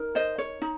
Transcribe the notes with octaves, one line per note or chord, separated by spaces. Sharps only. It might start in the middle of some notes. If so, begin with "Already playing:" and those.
Already playing: D#4 A#4
C5 D#5
C#5
D#4